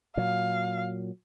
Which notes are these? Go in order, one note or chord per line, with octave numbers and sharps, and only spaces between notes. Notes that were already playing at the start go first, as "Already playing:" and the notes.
A#2 F#3 F5